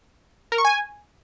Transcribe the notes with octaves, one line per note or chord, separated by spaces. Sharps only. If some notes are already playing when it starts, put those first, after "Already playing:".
A#4
C#6
G#5